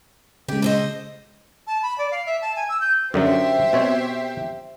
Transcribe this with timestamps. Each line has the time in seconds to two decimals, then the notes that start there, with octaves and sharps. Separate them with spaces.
0.48 C#3 G#3 G4
0.62 A4 C5 D#5
1.67 A5
1.82 B5
1.98 D5
2.11 F5
2.26 E5
2.42 A5
2.56 G#5
2.69 E6
2.80 G6
3.14 F#2 D3 F#3 G4 C5 E5
3.73 B2 C4 C#5